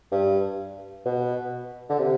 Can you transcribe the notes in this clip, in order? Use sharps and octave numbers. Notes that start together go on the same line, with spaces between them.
G2
B2
D3
C3